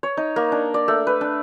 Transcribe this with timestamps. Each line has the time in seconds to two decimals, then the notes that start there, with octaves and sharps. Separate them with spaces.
0.03 C#5
0.17 D#4
0.36 A#3
0.52 D4
0.74 D5
0.88 A3
1.07 B4
1.21 D4